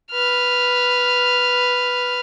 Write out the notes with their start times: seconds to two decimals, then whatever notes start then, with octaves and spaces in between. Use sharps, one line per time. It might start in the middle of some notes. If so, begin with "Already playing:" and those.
0.12 B4 F6